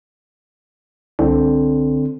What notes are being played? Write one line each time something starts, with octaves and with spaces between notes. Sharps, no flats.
C2 D3 C4